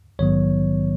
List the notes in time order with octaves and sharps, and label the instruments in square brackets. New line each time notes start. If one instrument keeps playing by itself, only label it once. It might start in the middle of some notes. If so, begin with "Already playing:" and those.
[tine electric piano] A#1 G#2 D#3 F#3 B3 C#5